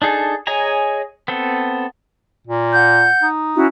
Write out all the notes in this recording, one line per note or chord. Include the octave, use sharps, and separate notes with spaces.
D4 D#4 G#4 A4
G#4 C#5 D#5 G#5 A#5
B3 C4 A4
A#2
F#5 G6
D#4
C#4 E4 F#4